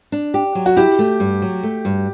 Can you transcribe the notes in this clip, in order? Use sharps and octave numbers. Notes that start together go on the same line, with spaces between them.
D4
G4
F#3
F#4
E4 G4
A3
G2
F#3
A3
G2